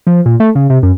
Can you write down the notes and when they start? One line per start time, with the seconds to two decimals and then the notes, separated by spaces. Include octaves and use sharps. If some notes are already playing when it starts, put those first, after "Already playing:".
0.07 F3
0.26 A#2
0.40 A3
0.55 C#3
0.70 C3
0.83 F#2